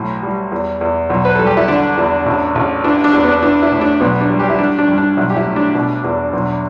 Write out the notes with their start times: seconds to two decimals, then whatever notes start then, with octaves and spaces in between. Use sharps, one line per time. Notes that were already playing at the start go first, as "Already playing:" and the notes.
Already playing: B1 A2
0.23 G3
0.52 E2
0.81 E2
1.10 B1
1.25 B4
1.35 G3 A4
1.47 G4
1.57 E4
1.68 D3 D4
1.97 E2
2.26 A1
2.55 A1
2.84 E3 D4
3.04 D4
3.13 E2
3.23 B3
3.43 E3 D4
3.62 E4
3.72 A2
3.81 D4
4.01 B1 B3
4.21 D4
4.30 G3
4.39 G4
4.50 E4
4.59 G3 D4
4.78 D4
4.88 G2
4.98 D4
5.17 B1 E4
5.30 G4
5.36 E4
5.46 A2
5.56 D4
5.75 B2 D4
6.04 E2
6.33 B1